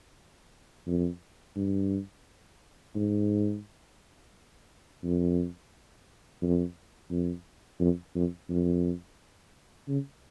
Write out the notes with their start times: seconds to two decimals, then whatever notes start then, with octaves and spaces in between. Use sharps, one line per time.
0.87 F2
1.56 G2
2.95 G#2
5.04 F2
6.42 F2
7.11 F2
7.80 F2
8.15 F2
8.49 F2
9.88 C#3